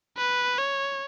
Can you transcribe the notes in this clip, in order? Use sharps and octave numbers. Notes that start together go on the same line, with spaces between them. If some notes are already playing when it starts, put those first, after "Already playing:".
B4
C#5